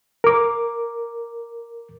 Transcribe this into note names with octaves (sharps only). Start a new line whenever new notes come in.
A#4 D6